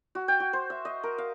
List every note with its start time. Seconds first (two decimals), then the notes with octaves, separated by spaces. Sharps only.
0.15 F#4
0.28 G5
0.40 F#4
0.53 C5
0.70 E5
0.85 D#5
1.04 A#4
1.18 F5